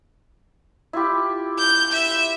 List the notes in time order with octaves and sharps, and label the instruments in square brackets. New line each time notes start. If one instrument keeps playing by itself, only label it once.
[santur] E4 F4 G4
[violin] G6
E5